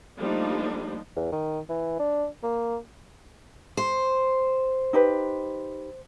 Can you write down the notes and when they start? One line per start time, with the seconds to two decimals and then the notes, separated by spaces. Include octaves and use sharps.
0.19 F3 G3 A3 A#3 D4 D#4
1.16 E2
1.32 D#3
1.69 E3
1.99 D4
2.43 A#3
3.77 C5
4.93 D#4 G4 B4